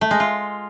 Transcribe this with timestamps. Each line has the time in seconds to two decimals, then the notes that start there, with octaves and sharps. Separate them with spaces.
0.01 A3
0.11 G#3
0.20 F4